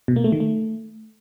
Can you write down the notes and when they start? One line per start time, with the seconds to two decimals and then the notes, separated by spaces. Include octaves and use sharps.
0.08 B2
0.16 A#3
0.24 A3
0.32 D#3
0.40 A3